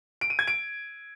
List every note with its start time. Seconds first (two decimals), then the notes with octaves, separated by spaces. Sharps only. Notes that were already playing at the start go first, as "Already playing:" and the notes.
0.21 D7
0.30 D#7
0.39 G#6
0.48 D7